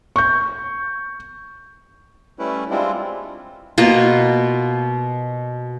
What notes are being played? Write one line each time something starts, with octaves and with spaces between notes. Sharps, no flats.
C#6 G6
G3 A3 C#4 E4 B4
G3 G#3 C4 D4 E4 F4
B2 A#3 F4